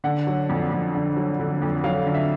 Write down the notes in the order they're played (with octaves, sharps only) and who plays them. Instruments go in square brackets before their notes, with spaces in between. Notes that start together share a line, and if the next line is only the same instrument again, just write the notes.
[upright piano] D3 F#5
F#3
F2
F2
D3
F#3
D3
F2
F#3 F5
D3
E5